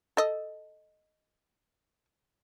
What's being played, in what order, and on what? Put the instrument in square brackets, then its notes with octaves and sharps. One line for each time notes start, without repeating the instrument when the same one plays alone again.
[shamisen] A4 D#5